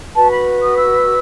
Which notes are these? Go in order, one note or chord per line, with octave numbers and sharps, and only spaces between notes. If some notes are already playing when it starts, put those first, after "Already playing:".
F#4 B4 A5
B5
D#6
E6